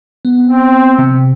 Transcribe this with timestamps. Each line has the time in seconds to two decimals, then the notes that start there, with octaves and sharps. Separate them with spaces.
0.25 B3
0.46 C4
0.99 C3